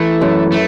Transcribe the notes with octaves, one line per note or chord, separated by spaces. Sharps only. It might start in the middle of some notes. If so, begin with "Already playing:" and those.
Already playing: E3 A3
F#2
A3